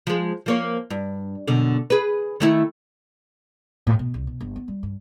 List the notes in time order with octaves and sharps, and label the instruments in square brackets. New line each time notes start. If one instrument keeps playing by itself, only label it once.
[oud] F3 G#3
F3 A#3 C#5
G2
F#2 B2 D3
G#4 B4
D#3 A3 E4
[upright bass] A2
B2
C2
B2
G1
B3
G3
G2